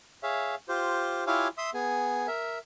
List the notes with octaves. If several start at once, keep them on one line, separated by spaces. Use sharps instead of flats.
G#4 C#5 E5 F5
F4 G4 C5
E4 F4 G4 C#5 F5 G#5
E5 C6 D#6 E6
B3 G#4 G#5
A#4 E5